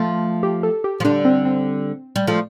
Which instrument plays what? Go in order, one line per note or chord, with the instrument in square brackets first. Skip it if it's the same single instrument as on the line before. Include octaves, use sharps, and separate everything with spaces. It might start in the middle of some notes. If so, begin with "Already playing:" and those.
Already playing: [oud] F3 A3
[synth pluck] G4
A4
G4
[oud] F3
[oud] D3 G3 [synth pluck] D4
[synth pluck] C4
C4
[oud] G3
F3 A3